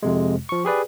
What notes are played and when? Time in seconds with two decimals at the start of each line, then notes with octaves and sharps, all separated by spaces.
0.03 F2 C3 G#3
0.49 F3 C#6
0.65 G4 G#4 B4 D5